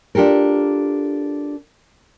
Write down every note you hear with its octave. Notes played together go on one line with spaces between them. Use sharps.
D4 F4 G4 A4 A#4